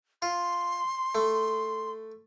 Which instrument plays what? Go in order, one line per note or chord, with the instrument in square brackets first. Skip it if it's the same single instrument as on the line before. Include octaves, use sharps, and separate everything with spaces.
[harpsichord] F4 [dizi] C6
[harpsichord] A3